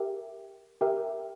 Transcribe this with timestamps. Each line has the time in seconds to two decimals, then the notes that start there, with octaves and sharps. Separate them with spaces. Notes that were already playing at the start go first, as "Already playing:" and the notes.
Already playing: G4 A#4 E5 G5
0.81 G4 A#4 E5 G5